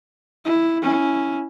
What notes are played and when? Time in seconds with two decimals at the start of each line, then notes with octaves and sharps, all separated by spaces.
0.45 E4
0.82 C#4 E4